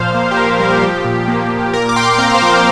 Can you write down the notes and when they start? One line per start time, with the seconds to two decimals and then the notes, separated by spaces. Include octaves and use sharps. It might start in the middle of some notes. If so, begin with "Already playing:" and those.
Already playing: A#2 F3 C5 F5
0.15 A#3
0.31 G4
0.37 A#3 A#4
0.48 G4
0.60 G3 A#4
0.70 A#4
0.82 F3 G4
1.05 A#2
1.28 A#3
1.51 A#3
1.74 A#2 A#4
1.89 D6
1.96 A#2 G5 C6
2.18 C4 F5 A#5
2.34 C5 F5
2.42 F3
2.49 A#4